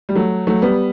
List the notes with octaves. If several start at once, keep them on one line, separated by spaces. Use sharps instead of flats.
G3
F#3 A3
F#3 A3
G3 B3